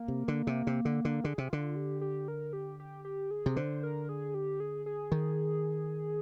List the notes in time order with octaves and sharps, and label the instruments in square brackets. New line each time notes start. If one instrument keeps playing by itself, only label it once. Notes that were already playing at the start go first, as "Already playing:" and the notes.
Already playing: [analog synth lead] A#3
[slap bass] C3
D3
C3
C3
D3
D3
[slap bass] D3 [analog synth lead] G#4
[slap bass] C3
[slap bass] D3 [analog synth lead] F4
[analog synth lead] G4
G4
A#4
G4
G4
G4
G#4
[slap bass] C3
[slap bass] D3 [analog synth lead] C5
[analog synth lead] A#4
G#4
G4
G#4
G#4
[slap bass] D#3